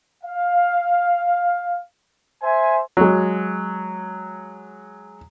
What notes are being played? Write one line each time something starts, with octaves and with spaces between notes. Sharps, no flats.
F5
C5 E5 G#5
F#3 G#3